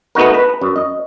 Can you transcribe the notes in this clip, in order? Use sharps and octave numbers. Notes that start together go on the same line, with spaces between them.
A3 B3 D#4 F#4 A#4
B4
F#2
D#5